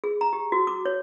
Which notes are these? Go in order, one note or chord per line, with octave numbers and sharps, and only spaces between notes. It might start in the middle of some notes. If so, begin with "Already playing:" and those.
G#4
A#5
G4
F#4
D6
C#5